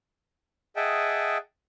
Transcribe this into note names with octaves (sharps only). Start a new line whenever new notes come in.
G#4 D#5 E5 F#5 G5 A5